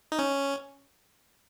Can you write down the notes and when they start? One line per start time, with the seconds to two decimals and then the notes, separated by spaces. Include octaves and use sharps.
0.12 D#4
0.19 C#4